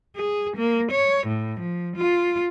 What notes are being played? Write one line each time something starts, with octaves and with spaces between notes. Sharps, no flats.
G#4
A#3
C#5
A2
F3
F4